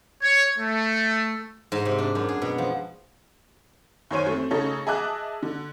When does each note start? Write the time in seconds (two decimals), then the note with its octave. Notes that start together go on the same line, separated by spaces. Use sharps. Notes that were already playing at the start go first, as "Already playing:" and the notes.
0.22 C#5
0.59 A3
1.72 G#2
1.85 C3
1.98 D4
2.15 F#2
2.29 G#4
2.42 B2
2.58 F3
4.11 F#2 D#3 C#4 C5 C#5 D#7
4.26 A3 C4
4.51 C#3 A3 D#4 A4 C#5
4.87 G#4 D#5 E5 A5 D6 F#6
5.43 D3